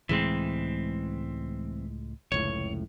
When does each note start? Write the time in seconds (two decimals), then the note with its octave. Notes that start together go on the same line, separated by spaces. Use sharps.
0.09 C#2 A2 E3 G#3 C4
2.32 F1 C#2 A2 C#5